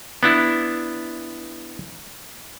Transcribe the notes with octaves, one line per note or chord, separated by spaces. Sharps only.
B3 D4 E4